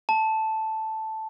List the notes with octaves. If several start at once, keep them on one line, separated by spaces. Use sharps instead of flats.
A5